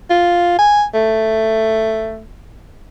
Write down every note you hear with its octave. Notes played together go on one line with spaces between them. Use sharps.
F4
G#5
A3